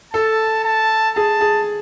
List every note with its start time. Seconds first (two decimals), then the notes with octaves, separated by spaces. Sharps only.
0.14 A4 A5
0.65 A5
1.16 G#4 A5
1.41 G#4